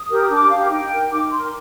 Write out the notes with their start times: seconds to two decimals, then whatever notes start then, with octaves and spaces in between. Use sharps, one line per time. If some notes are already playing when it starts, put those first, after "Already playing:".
Already playing: D#6
0.09 G4 A#4
0.29 D4 D6
0.49 G4 A#4 F5
0.70 D#4 G5
0.90 A#4
1.10 D#4 D6
1.30 A#4 C6